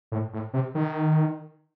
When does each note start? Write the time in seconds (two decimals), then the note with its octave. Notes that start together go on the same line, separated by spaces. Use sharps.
0.12 A2
0.33 A2
0.53 C3
0.75 D#3